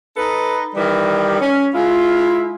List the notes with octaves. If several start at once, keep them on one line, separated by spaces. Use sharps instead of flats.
D#4 A4 B4
D#3 E3 G3
C#4
G#3 E4 F4